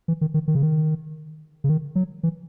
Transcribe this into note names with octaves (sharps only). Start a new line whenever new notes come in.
E3
D#3
D#3
D#3
C#3
D#3
C#3
D#3
F#3
E3